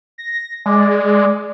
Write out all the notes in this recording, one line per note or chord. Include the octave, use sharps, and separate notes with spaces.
A#6
G#3 D5